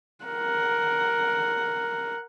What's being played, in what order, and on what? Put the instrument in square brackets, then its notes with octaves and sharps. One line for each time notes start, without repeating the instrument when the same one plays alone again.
[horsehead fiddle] A#4 F#5